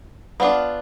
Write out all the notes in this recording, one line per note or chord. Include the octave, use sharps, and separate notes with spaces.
B3 D4 F4